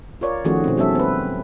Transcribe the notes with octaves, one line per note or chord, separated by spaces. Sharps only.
F4 A#4 C#5 D5
D#3 F3 A3 C#4 F#4 G#4
B2 C4
F#3 G3 C#4 A4 E5
C4 B4